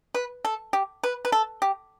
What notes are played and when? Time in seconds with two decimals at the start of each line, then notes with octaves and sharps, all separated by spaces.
0.14 B4
0.45 A4
0.73 G4
1.03 B4
1.25 B4
1.32 A4
1.62 G4